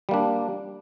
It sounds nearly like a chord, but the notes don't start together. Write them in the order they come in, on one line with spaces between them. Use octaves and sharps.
G3 A#3 D4